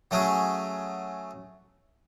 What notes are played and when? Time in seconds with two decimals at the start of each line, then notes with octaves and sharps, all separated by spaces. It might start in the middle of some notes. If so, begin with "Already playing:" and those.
0.11 F#3 A3 C#4 G#4